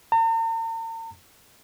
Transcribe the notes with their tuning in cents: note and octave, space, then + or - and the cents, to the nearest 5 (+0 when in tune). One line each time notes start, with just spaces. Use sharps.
A#5 -45